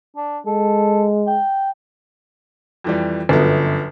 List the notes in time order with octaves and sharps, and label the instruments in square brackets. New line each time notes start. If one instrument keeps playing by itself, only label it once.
[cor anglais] D4
[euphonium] G#3 [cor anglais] A4
[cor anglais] G5
[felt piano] F2 E3 G3
[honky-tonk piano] G1 [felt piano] F#2 F3 B3